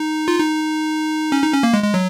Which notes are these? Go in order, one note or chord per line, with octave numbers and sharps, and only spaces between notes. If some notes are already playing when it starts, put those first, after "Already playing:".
Already playing: D#4
F4
D#4
C#4
D#4
C#4
A#3
G#3
G#3
F#3